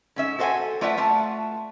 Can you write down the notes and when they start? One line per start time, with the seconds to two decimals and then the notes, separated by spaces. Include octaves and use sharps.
0.16 G#2 C#4 E5
0.39 F#4 A4 C5 F5 F#5 G#5
0.81 A3 F4 B4 D5 E5 F#5
0.97 A3 F4 F#5 A5